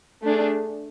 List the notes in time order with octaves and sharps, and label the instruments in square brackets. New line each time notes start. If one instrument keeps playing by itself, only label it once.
[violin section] A3 D4 G#4